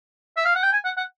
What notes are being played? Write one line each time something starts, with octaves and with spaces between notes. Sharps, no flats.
E5
F5
F#5
G5
G#5
F#5
F#5